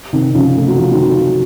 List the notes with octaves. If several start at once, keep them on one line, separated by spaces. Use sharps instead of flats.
C3 D#3
C#3 F3
A3
F#3
F3
D#3 F#3